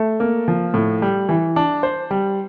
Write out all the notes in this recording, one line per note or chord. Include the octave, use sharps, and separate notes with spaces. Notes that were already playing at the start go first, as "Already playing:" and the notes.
Already playing: A3
A#3
F3
A2
G3
E3
D4
C5
G3